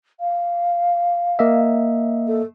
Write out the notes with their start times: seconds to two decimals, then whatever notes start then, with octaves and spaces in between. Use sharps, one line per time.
0.20 F5
1.39 A#3 D#5 E5
2.28 A4